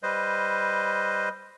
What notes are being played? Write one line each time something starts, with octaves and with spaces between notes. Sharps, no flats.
G3 B4 C5 D#5